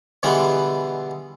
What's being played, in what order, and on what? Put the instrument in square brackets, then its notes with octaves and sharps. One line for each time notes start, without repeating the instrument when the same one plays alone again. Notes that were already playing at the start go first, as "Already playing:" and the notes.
[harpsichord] B2 D3 E3 G3 G#3 B3